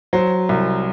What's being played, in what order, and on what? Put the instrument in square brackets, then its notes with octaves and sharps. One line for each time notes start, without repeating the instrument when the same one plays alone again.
[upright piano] F#3 C5
C2